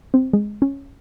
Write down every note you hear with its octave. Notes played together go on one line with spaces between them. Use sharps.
C4
G#3
C#4